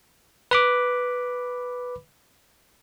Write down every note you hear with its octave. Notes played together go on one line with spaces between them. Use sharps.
B4 B5 D6